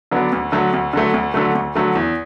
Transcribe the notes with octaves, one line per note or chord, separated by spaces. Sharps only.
D3 F#3 B3 D4
D2
D3 F#3 A3
D2
D3 F#3 A3
D2
D3 F#3 A3
D2
D3 F#3 A3
E2